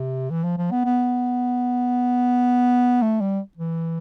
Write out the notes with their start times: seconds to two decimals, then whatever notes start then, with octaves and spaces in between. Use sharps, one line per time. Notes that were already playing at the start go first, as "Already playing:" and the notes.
Already playing: C3
0.30 E3
0.44 F3
0.58 F3
0.71 B3
0.85 B3
3.02 A3
3.20 G3
3.57 E3